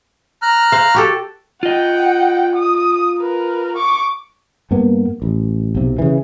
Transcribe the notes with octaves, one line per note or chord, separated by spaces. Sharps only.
A#5 F6 F#6
C5 F5
F#4 G4 A4
F4 D#5 F#5 G5
D#6
A#4 B4
C#6 D6
G2 A#3 B3
A1
B1 C3
C#3 E3